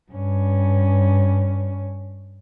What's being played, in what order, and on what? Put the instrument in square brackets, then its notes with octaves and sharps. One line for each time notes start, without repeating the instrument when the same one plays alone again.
[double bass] G2 C#4